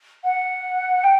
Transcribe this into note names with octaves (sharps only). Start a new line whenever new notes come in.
F#5
G5